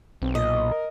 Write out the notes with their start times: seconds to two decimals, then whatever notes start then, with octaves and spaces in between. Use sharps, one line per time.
0.22 B1 C4
0.35 A#2 D#5
0.72 A#4